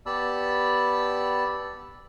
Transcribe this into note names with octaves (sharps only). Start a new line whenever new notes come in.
B3 G4 D5 A5 B5 E6